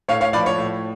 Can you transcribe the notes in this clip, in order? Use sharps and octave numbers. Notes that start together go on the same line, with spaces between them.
A2 C#5 F5
C#5 F5
F3 B4 D5
C#5
A2